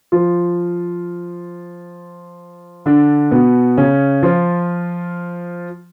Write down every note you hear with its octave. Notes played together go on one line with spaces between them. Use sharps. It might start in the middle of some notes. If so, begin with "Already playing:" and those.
F3 F4
D3 D4
B2 B3
C#3 C#4
F3 F4